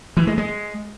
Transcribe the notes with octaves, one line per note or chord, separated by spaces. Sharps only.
E3
G#3
G#3